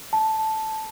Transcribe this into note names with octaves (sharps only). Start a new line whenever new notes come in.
A5